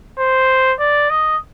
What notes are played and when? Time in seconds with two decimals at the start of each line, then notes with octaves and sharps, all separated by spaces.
0.19 C5
0.80 D5
1.10 D#5